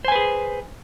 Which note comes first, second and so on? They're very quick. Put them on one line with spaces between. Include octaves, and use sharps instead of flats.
C5 G#5 B4 G#4